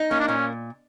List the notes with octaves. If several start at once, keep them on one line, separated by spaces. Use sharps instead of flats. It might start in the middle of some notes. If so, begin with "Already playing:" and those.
Already playing: D#4
A#3 C#4
D4
A#2 C#4